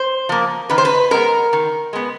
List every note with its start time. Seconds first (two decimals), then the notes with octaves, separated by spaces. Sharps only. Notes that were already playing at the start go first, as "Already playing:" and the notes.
Already playing: C5
0.29 F3 A#3
0.70 D#3 B4
0.78 C5
0.85 B4
1.11 G#3 B3 A#4
1.53 D#3
1.93 G#3 B3